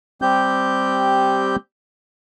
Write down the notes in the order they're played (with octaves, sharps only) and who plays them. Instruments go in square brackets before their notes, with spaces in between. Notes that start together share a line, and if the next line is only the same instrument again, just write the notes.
[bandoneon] G3 C4 G4 G6